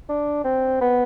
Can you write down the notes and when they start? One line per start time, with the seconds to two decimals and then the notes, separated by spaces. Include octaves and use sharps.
0.09 D4
0.44 C4
0.81 B3